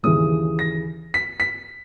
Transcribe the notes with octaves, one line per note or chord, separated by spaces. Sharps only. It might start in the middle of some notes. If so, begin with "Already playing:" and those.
D#2 C#3 E3 D#6
A#6
B6
B6